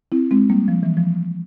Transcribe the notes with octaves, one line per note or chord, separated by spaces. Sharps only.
C4 E4
G#3 C4
G3 A#3
F3
E3
F3